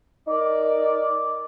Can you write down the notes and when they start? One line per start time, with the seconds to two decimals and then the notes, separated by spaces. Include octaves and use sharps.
0.27 D#4 A#4 D5